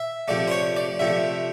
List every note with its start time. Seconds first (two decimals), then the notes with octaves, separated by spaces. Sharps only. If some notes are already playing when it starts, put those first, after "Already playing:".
Already playing: E5
0.28 C3 F3 A3 D5
0.48 C5
0.52 C#5
0.76 D5
0.99 C3 F3 A3 E5